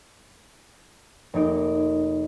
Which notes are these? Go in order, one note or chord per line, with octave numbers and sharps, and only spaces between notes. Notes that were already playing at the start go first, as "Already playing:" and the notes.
F1 A#3 D#4 D7